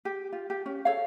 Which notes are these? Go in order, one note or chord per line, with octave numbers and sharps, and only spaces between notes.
G4
F4
G4
C#4
A4 C#5 F5